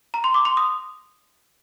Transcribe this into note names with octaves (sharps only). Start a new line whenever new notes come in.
A#5
C6
D6
C6
D#6